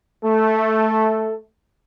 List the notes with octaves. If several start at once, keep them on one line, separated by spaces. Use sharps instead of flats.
A3 A4